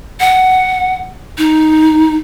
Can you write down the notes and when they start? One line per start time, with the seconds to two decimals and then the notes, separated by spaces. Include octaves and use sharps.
0.20 F#5
1.38 D#4